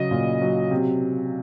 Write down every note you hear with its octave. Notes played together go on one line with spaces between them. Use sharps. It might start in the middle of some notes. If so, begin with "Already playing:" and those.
Already playing: C#3 F#3 D#5
A#2
F#3
C3